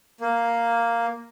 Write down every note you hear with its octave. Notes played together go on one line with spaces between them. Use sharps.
A#3